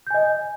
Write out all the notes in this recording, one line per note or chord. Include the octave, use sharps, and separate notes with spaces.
D#5 G#5 G6